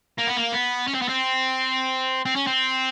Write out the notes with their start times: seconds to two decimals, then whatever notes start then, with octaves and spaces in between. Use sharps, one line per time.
0.19 A#3
0.27 B3
0.37 A#3
0.53 B3
0.88 C#4
0.95 C4
1.02 B3
1.09 C4
2.26 C4
2.36 C#4
2.47 C4